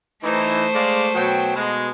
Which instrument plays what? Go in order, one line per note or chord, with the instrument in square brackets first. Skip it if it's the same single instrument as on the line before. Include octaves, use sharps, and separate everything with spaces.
[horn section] E3 D#4 [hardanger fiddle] A3 C5
[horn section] G#3 D5 F5
B2 F#3 G5
B2 G#3